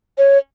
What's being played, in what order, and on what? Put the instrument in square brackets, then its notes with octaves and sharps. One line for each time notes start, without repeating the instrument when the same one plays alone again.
[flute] C#5